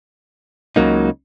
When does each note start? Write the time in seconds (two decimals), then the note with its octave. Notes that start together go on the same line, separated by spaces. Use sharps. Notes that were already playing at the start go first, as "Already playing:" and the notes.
0.76 C#2 C#3 F#3 A#3 D#4